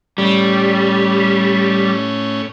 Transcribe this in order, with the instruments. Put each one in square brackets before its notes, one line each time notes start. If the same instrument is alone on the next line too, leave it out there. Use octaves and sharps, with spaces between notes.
[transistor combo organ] A2 C#4 [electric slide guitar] G3